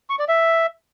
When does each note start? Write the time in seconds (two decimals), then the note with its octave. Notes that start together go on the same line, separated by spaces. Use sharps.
0.10 C#6
0.19 D5
0.28 E5